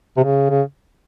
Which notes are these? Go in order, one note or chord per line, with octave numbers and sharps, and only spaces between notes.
C3
C#3
C#3